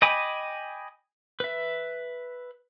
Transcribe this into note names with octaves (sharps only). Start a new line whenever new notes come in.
D#5 G5 G#5 B5 D6
B4 E5